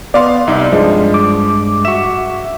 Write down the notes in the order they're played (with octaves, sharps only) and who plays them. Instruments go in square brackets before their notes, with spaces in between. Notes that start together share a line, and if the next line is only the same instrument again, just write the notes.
[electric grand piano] B3 F5 C6 [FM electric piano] D5
[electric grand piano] C2 D#4 E5
[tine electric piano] G2 G#3 [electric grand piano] F3
[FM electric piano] D6
[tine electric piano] F#4 E5 [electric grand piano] C#6 E7